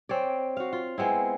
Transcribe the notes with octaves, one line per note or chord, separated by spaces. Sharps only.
C4 C#5 D5
F#4 F5
F4
G#3 B3 C4 E4